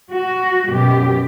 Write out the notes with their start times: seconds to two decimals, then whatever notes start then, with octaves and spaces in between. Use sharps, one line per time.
0.12 F#4
0.68 F#2 B2 G4